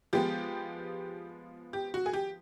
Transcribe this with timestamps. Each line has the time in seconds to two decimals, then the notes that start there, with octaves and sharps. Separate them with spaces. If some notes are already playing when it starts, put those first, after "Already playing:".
0.13 F3 G#3 B3 G4
1.73 G4
1.94 F#4
2.06 G#4
2.13 G4